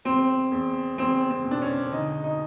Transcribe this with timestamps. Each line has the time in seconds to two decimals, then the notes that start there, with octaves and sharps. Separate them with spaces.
0.05 E2 C4
0.52 E2
0.98 E2 C4
1.31 C4
1.45 B2
1.51 D4
1.62 C#4
1.92 D3 D#4
2.24 D#4